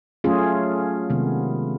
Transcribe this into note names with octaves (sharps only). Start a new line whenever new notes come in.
F#3 A3 C#4 F4 G#4
C3 D#3 G#3 B3